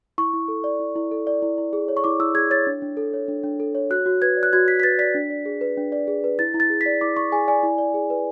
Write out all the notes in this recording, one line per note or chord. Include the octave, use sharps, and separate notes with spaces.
E4 C#6
E4
A4
D5
E4
E4
A4
D5
E4
E4
G#4
C#5
C#6
E4 D6
E4 E6
G#4 G#6
C#5 A6
D4
D4
A4
C#5
D4
D4
A4
C#5
F#4 F#6
F#4
B4 G#6
D5
F#6
F#4 G#6
F#4 B6
B6
B4 A6
D5 B6
D4
D5
G#4
B4
D4
D5
G#4
B4
E4 A6
E4
A6
G#4
B6
D5
E4 D6
E4 C#6
G#4 G#5
D5 G#5
E4
D5
G#4
B4